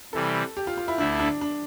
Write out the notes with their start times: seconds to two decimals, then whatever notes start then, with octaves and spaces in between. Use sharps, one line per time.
0.13 C3 E3 G3 A4
0.57 G4
0.67 F4
0.77 F4
0.88 E4
0.98 D2 D3 A3 D4 E4
1.20 D4
1.41 D4